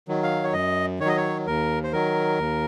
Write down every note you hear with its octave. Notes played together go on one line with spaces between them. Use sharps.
D#3 F#3
F5
C#5
F#2 D#5
D#3 C#5
F#3 D#5
C#5
D#2 A#4
C5
D#3 F#3 A#4
D#2